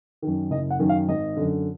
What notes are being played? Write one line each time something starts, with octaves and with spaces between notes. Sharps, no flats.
F#2 D#3
F#1 D#5
F#5
F#2 D#3
F5
G#1 D#5
F#2 D3